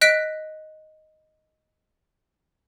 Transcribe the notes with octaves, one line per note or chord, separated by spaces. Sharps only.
D#5 F#6 B6 D7